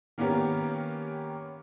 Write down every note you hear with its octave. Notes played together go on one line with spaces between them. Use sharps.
D#3 A#3 B3 C#4 G4 A#4